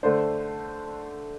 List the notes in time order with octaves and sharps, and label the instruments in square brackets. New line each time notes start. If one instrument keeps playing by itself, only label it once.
[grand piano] D3 A3 D4 C5